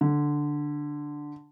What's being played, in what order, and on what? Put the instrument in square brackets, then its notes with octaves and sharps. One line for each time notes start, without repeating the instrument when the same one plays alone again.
[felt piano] D3